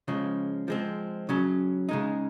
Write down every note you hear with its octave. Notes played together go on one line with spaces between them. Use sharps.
C#3 F3 G#3
F3 G#3 C4
C#3 F#3 C#4
C#3 G#3 D#4